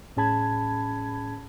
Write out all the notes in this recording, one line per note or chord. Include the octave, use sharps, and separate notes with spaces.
A2 C#4 G#4 A5 B5 G#6